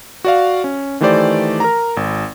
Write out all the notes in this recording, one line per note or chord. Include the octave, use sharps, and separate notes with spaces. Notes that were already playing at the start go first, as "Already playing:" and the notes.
F#4 D5 F5
C#4
D#3 E3 A3 G4 C5 D5
A#4 A#5
G#1